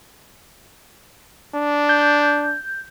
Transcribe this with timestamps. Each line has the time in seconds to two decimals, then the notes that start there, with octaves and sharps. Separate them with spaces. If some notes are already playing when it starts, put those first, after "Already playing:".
1.55 D4
1.89 G6